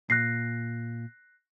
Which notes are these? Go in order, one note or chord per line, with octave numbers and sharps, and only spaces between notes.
A#2 F#6 A#6 C7